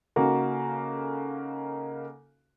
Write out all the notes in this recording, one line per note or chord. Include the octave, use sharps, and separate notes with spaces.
C#3 A#3 D#4 F#4 A4